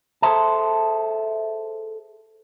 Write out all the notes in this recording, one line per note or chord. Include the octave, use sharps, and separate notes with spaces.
G#4 A4 C5 E5 A5